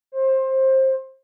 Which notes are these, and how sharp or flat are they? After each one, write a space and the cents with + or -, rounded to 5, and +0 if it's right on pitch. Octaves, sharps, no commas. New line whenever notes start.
C5 +20